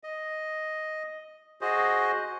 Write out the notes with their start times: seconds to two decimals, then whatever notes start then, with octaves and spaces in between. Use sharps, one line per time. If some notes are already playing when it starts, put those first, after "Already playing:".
0.04 D#5
1.61 F#4 G#4 C5 D#5